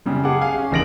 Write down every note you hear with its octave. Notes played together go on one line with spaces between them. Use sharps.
F#2 C#3 G3
G4 G#4 F#5 A5 D6
F5 G#5
C#4
F1 E2 D#3 A#6 D7 F#7